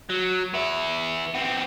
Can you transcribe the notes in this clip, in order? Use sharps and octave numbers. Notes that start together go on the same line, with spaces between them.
F#3
B3 E4
B3 C4